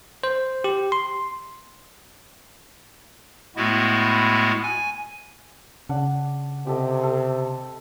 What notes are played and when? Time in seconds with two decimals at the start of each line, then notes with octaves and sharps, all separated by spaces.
0.24 C5
0.64 G4
0.92 C6
3.56 A2 G#3 A3 B3 E4 F#4
4.63 G#5
5.89 C#3 D4 F#5
6.67 C3 G4 A4 D#5
7.03 A4